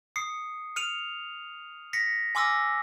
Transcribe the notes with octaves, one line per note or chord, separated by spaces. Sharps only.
D#6 C7 C#7
F6 C#7 D#7 F7
A#6 B6 C#7
G#5 C6 D6 E6 F6 A#6